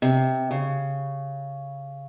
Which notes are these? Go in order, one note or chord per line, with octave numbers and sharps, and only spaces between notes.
C3
C#3